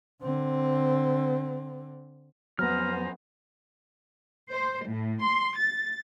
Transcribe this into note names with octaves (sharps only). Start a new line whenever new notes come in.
D3 C4
F2 F#3 B3 C5 G#5 A#5 F6
C5
A2
C6
A6